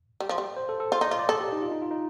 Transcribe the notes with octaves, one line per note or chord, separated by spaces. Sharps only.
G3
F3
G3
C5
A4
A4
F4 C5
D#4 D5
F4 D#5
D5
A4 D#5
G4
D#4
F4
D#4
F4
D#4